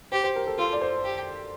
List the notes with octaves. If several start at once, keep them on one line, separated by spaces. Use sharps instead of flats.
G4 C5
C5
A#4
A4
F4 A4
D5
C5
G4